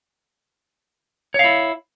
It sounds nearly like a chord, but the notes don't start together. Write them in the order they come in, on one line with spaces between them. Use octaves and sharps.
C#5 F5 E4